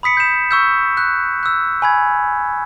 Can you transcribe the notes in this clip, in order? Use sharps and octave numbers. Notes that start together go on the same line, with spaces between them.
B5 D#6 B6 C#7
G6 E7
C#6 E6 G6
F#6
E6 F#6
G#5 B5 G#6